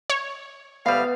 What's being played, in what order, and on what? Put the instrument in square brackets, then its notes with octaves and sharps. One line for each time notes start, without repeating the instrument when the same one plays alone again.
[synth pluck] C#5
[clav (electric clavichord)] D2 G3 [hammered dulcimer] B3 [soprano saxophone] F5